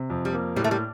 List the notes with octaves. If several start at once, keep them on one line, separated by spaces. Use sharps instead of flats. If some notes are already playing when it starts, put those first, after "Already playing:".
Already playing: C3
F2
G3
A#3
A2 G3
A3
G3